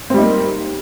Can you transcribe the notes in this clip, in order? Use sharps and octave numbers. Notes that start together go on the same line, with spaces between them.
G3 A#3 C4 D#4